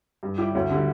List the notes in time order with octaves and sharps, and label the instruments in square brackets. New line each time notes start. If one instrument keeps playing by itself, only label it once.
[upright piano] G2
G3 E4 G4
D2
D3 G3